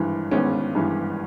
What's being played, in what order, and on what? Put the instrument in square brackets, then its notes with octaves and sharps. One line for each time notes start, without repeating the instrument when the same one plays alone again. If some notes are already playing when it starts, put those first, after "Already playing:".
Already playing: [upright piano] G#1 G2 E3
G#1 B3 C#4
G2 E3